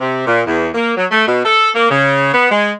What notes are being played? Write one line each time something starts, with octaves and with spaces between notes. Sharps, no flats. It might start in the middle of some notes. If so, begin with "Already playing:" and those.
C3
A#2
E2
A#3
F#3
A3
B2
A4
A#3
C#3
B3
G#3